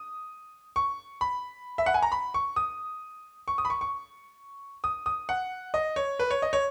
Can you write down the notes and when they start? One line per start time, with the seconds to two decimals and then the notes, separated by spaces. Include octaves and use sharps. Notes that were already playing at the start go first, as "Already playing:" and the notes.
Already playing: D#6
0.76 C#6
1.21 B5
1.78 E5
1.86 F#5
1.94 G#5
2.03 A#5
2.12 B5
2.34 C#6
2.56 D#6
3.48 C#6
3.58 D#6
3.65 B5
3.70 C#6
3.81 C#6
4.84 D#6
5.06 D#6
5.29 F#5
5.74 D#5
5.96 C#5
6.19 B4
6.31 C#5
6.42 D#5
6.53 C#5